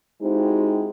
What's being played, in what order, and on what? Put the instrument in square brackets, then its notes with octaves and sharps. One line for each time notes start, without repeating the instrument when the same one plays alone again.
[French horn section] G#3 C4 D#4 E4 F#4 G4